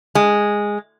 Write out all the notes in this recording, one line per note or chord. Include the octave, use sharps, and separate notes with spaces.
G#3